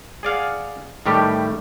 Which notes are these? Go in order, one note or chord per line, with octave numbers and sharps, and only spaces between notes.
G#4 D5 F5 F#5
A2 D#3 G3 A3 G4